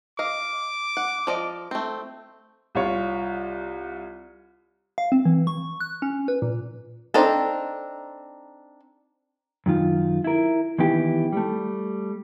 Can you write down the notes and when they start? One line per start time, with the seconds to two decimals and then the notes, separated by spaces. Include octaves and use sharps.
0.19 D#5 F5 D6
0.97 F#5
1.27 F3 D5 D#5
1.71 A3 C4
2.75 C2 F4 C#5
4.98 F5
5.12 C4
5.25 E3
5.47 C#6
5.81 F#6
6.02 C#4
6.28 B4
6.42 A#2
7.14 C4 D4 D#4 A4
9.66 F#2 D#3 F4
10.24 E4 A#4
10.78 D#3 E3 B3 E4 G4
11.32 G3 A3